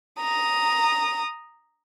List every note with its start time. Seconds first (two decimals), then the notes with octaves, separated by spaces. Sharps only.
0.20 A#5 D#6